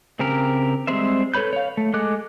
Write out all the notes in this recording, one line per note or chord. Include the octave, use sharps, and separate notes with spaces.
C#3 C4 G4 A#4
G3 G#3 C4 C5 E5
A4 B4 C#5 B5 G6
C#5 F5
A3
G#3 A4 D6 F#6